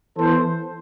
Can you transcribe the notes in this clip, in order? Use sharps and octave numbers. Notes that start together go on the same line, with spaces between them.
E3 B3 A4 C5